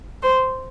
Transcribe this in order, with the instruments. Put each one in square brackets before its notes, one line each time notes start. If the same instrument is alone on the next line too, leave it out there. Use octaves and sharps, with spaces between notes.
[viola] C5